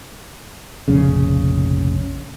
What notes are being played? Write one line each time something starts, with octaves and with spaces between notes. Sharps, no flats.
F1 A#1 C#3